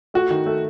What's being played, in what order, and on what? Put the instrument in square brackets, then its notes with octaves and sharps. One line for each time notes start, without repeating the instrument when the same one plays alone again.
[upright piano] A3 [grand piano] F#4
[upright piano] D#3
A3